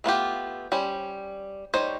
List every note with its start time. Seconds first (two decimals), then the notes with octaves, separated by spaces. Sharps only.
0.04 A3 B3 F4 G4
0.72 G3 C#4 C5
1.74 G3 D#4 C5 C#5